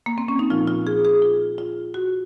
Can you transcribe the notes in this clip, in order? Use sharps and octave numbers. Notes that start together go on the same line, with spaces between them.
A#3
C4
C#4
D#4
A#2 F3 F4
F4
G#4
G#4
F4
F4
F#4